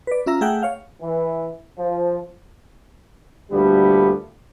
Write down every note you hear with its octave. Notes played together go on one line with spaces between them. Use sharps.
B4 D5
C#4 F4 E5 A#5
A3 G#4 A4 E5 F#5 G5
C#5 F5
E3
F3
D2 A#2 D3 G3 A3 B3